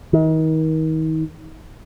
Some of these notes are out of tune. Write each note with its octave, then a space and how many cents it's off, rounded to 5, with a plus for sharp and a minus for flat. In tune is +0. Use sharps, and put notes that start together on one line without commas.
D#3 +35